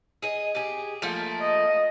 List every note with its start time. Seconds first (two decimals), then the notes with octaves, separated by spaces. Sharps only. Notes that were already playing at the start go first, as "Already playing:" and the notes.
0.22 G#4 D#5
0.55 G4 G#4
1.02 F3 A3 A#3
1.42 D#5